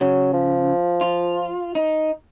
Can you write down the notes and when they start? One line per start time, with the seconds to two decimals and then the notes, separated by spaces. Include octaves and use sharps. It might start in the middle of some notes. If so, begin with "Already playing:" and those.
0.01 C#3 F#3
0.33 F3
1.01 F4
1.75 D#4